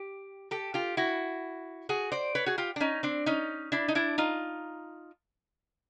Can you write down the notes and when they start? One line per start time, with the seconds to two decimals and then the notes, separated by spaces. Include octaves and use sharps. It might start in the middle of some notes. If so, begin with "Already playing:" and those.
Already playing: G4
0.51 G4 A4
0.74 F4 G4
0.97 E4 F#4
1.89 F#4 G#4
2.12 C5 D5
2.35 B4 C#5
2.46 F#4 G#4
2.58 F4 G4
2.76 D4
2.80 C#4 D#4
3.03 C4 D4
3.26 C#4 D#4
3.72 D4 E4
3.88 D#4
3.95 D4 E4
4.18 D#4 F4